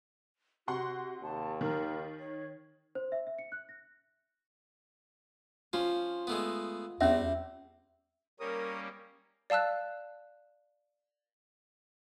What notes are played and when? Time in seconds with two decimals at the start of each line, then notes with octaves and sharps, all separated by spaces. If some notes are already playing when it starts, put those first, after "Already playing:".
0.68 C3 F#4 F#5 C6
1.22 D#2 A5
1.61 D#3 A#4
2.19 C#5
2.95 C5
3.12 E5
3.27 E5
3.39 C#7
3.52 F#6
3.69 A#6
5.73 F3 C#4 F4
6.27 G#3 A3 B3
7.01 E2 G3 C4 C#4 E5
8.40 G3 A#3 C#4 A#4 C#5 D#6
9.50 D5 F5 A5 E6 F#6